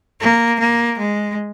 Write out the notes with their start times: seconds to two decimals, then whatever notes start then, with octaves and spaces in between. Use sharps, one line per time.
0.21 A#3
0.60 A#3
0.99 G#3